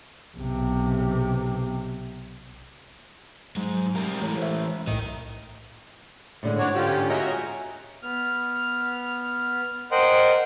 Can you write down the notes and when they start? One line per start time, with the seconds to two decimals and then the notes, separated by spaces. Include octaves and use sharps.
0.37 B1 C3
3.56 G#2 F#3 G#3
3.95 G3 A#4
4.21 E3 G#3 A3 C#5
4.38 C5 E5
4.87 B1 A2 A#4 D#5
6.43 A2 D3 G#3
6.58 G#2 D3 D4 F#4 C#5
6.75 C#4 F4 G4
7.10 F#4 G#4 C#5 D#5 E5 A#5
8.03 B3 F6
9.91 A#4 C5 D#5 F#5 G5 C6